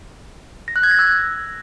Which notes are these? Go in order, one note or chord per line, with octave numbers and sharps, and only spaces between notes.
A#6
F#6
G#6
A#6
E6